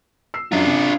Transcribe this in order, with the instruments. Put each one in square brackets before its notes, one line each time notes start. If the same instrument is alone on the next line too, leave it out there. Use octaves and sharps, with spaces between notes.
[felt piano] E6 C7
[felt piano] F#2 [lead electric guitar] D4 F4
[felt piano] C3